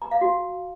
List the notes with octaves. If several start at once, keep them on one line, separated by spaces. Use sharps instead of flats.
A#5
F5
F#4